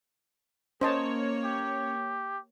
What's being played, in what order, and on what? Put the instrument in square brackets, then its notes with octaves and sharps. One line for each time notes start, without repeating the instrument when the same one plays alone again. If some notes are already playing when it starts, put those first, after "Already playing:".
[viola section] A#3 C#5 [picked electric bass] C#4 [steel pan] C5 D#5 A5
[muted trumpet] G4